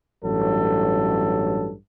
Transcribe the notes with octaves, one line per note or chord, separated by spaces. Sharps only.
A1 G2 F#3 A4